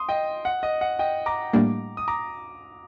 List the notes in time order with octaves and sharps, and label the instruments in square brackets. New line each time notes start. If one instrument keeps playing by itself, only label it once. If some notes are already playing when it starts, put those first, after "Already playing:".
Already playing: [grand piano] C6 D#6
D#5 G5
F#5
D#5
F#5
D#5 G5
A#5 D6
[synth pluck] A2 G3 A#3 D4
[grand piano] D#6
A#5 D6